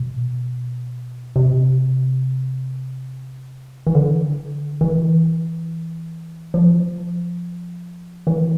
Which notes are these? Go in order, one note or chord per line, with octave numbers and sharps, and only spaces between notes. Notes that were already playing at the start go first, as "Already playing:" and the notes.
Already playing: B2
C3
E3
D3
E3
F3
E3